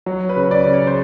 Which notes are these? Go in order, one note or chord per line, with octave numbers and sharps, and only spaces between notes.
F#3
B4
C#3
D5
C#3
C#5
C5